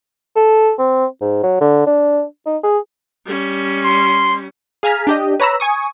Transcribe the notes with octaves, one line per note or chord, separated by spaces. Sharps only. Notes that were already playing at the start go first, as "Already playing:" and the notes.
A4
C4
G#2
F#3
D3
D4
D#4
G#4
G3 C#4
C6
G#4 F5 G#5 A#5 F6 B6
D4 G4 D#5
B4 C#5 A#5 B5 E6
G#5 C#6 D#6